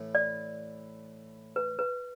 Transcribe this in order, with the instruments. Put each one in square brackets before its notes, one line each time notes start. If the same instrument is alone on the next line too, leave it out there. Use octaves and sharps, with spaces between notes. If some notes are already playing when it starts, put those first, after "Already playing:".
Already playing: [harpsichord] A2 E3 A3
[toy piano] D5
B4
B4